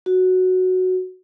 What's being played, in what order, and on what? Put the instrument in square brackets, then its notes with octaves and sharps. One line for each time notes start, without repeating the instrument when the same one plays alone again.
[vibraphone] F#4